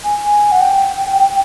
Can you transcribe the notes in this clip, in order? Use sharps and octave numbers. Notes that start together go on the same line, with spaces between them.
G#5
G#5
F#5
G5